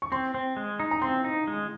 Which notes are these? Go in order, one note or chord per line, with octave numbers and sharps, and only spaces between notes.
C#6
C4 C6
C4
G#3
D#4
A#5
C4 C6
D#4
G#3